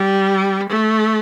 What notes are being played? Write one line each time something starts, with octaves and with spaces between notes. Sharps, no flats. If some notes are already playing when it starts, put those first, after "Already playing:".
Already playing: G3
A3